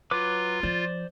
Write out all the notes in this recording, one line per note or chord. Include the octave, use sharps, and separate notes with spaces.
F#3 F4 B4 D6
F3 C5 D5